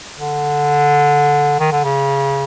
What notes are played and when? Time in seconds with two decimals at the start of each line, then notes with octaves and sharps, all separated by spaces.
0.19 D3
1.60 D#3
1.72 D3
1.84 C#3